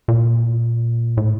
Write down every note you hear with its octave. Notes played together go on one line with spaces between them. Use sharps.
A#2
A2